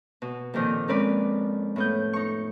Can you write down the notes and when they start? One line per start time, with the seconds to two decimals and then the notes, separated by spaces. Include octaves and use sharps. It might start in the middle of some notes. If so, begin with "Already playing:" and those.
0.22 B2
0.54 F2 A#2 D#3 C5 D#5
0.88 G#3 C4 C#4 A#4 B4 D5
1.76 A2 B3 G6
2.13 D#4 C#6